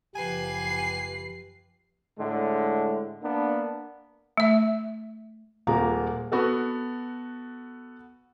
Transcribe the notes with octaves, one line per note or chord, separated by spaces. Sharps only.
F#1 F3 G4 B4 G#5 C7
A2 D3 G#3
A#3 B3 D4
A3 E5
D#1 G#3 A#3 F4 A#5
B3 F#4 A4